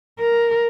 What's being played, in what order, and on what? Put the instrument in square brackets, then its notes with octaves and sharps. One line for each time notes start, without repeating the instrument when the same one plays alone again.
[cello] A#4